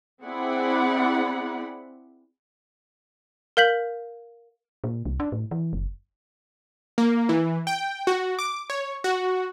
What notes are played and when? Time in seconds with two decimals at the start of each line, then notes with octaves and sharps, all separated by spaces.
0.23 C4 E4 G#4 D5 F#5 B5
3.57 A#4 F5 G6 B6 F#7
4.84 A#2
5.05 C2
5.20 D4
5.32 A2
5.51 E3
5.73 F#1
6.98 A#3
7.29 E3
7.67 G5
8.07 F#4
8.39 D6
8.70 C#5
9.04 F#4